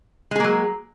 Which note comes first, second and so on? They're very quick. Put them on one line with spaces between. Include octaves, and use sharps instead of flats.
G#3 G#4 A#3 F#3